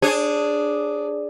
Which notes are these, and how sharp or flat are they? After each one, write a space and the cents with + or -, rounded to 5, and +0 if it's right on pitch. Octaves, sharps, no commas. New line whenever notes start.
D4 +0 G#4 +0 C#5 -35